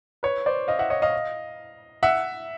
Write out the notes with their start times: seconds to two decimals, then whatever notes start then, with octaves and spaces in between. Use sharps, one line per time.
0.23 B4 C#5
0.46 C5 D5
0.68 D#5 F5
0.79 E5 F#5
0.90 C#5 D#5
1.02 D#5 F5
2.03 E5 F#5